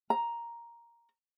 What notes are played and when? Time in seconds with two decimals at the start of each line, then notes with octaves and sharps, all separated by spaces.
0.10 A#5